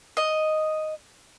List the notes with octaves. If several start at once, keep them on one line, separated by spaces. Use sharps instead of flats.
D#5